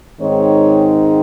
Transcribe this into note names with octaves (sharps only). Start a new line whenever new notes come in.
G#2 D#3 G#3 C4 D#4 C#5